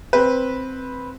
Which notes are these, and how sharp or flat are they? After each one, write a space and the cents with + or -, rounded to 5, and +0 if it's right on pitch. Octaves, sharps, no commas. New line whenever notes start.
C4 +0 B4 -5